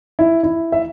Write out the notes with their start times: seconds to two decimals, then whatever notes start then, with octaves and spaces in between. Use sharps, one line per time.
0.19 E4
0.43 E4
0.72 E5